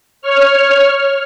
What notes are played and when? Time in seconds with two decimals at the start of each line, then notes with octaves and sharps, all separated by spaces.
0.22 C#5 F6